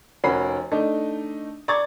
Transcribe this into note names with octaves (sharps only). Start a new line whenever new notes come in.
F1 C#4 F#4 A#4 B5 C7
A3 D4 D#4
D5 A#5 C#6 G#6 A6